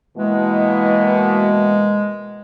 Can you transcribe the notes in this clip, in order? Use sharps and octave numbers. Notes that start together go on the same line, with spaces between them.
B2 E3 G#3 A#3